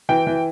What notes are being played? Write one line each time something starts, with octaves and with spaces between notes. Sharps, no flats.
E3 G5
E3